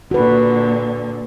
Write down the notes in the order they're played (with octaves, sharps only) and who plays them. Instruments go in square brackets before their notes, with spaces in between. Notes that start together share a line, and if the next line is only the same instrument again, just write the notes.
[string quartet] A#2 D3 [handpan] F#4 B4